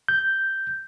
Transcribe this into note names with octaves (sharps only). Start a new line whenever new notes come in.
G6